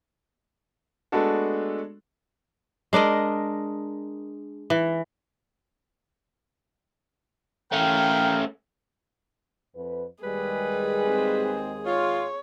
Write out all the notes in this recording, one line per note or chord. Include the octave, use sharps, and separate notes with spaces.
G#3 A3 B3 D4 F#4 A4
G#3 D4 A#4 D#5
E3
A3 C#4 A#4 F5 G5
F2 B4
D#2 G3 G#3 G#4 B4
C4
F4 C#5